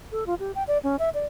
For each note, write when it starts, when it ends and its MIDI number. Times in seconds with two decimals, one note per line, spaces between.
0.12 0.24 69
0.27 0.35 65
0.40 0.51 67
0.55 0.63 79
0.68 0.78 74
0.83 0.96 61
0.99 1.09 76
1.14 1.25 74